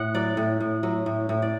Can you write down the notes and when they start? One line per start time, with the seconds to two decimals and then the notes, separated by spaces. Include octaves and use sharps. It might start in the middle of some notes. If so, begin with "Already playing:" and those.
Already playing: A2 F#5
0.14 F#3 D5
0.37 A2
0.61 A2
0.83 F#3
1.06 A2
1.29 A2
1.42 D5